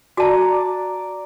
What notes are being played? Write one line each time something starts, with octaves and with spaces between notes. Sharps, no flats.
F#4 D5 F#5 A5 A#5